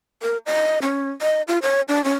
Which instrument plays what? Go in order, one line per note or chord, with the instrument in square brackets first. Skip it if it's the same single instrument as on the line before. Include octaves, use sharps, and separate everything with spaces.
[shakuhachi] A#4
D#5
C#4
D#5
F4
C#5
D4
C#4